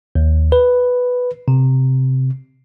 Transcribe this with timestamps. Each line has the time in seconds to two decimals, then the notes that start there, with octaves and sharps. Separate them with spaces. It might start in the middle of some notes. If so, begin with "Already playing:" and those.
0.15 D#2
0.52 B4
1.48 C3